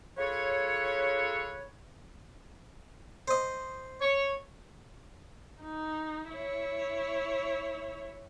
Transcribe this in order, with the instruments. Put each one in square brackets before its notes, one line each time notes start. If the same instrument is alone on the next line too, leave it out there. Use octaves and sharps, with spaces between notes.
[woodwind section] F4 G#4 A4 B4 C#5
[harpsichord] C5 D#5
[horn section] C#5
[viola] D#4
E4 C#5